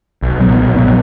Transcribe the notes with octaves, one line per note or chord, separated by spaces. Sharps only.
B1
A#2 F#3 B3
B1
A#2 F#3 B3